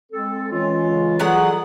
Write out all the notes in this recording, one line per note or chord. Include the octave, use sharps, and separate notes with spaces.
G#3 C4 A4
E3 G#3 C#4 F4
C#3
E3 F#3 G3 G#4 A4 F#5